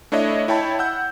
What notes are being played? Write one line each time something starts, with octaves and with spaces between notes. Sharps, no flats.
A3 D4 E4 C#5 D#5 E5
E4 C#5 G5 A5 B5
F#5 E6 G6